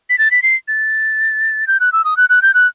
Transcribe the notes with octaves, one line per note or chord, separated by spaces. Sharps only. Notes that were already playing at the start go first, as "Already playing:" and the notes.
B6
A6
B6
C7
A6
G6
F#6
E6
D#6
F#6
F#6
G6
F#6